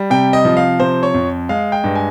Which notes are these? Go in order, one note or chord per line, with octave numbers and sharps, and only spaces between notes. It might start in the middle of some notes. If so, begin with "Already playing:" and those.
Already playing: G3
C3 G5
D#5
F3
F5
C3 C5
C#5
F2
G#3 F5
G5
G2
G#5